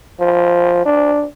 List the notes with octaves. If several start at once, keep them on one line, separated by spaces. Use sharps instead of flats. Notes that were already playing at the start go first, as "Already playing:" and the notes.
F3
D4